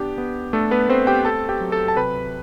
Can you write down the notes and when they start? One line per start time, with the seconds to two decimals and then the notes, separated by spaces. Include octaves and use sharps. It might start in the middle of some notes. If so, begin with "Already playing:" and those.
Already playing: B3 D4 G4
0.18 B3
0.53 A3 D4 A4
0.71 B3 B4
0.89 A3 C4 C5
1.07 G4 G5
1.25 C4 A4 A5
1.49 G4 G5
1.60 F#3
1.72 A4 A5
1.88 A5
1.97 C3 B4 B5